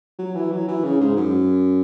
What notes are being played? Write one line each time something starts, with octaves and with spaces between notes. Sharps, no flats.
F#3
E3
F#3
E3
C#3
G#2
F#2